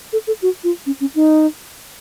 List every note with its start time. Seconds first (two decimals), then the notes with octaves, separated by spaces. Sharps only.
0.13 A4
0.27 A4
0.42 F#4
0.64 F4
0.86 C#4
1.00 C#4
1.15 D#4